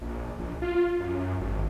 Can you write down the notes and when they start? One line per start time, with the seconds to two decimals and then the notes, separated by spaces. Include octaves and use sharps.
0.01 A#1
0.39 A#1
0.62 F4
1.00 F#2
1.41 G#1